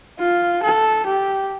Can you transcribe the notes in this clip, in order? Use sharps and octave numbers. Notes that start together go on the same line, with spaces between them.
F4
A4
G4